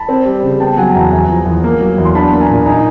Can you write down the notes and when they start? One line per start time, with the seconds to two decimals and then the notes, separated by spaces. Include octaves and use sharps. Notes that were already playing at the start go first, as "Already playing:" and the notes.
Already playing: A5 B5
0.09 C4
0.25 G3
0.43 C#3
0.60 B3 G5 A5
0.78 F#3 F#5 G#5
0.89 A5
0.95 E2 G#5 A#5
1.12 E2 G#5 A#5
1.29 F3
1.46 E2
1.64 A#3
1.80 F#3
1.98 E2
2.05 C6
2.15 D4 A5 B5
2.32 A#3
2.40 G#5 A#5
2.50 A#2
2.66 D#4 G#5 A#5